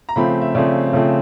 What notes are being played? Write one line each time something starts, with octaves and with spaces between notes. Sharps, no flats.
A#5
C#3 F3 A3 C4 B5
E5
C#3 F3 A3 C4 D5
C#3 F3 A3 C4